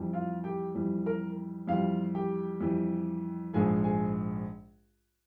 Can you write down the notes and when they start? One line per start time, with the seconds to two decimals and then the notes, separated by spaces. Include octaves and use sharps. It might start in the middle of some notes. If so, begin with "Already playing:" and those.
Already playing: F2 E3 G3
0.13 F4 F5
0.44 G4 G5
0.75 F2 E3 G3
1.06 A#4 A#5
1.68 F2 E3 G3 F4 F5
2.15 G4 G5
2.61 F2 E3 G3
3.53 A#1 G#2 F3 G#3 G#4 G#5
3.84 G#4 G#5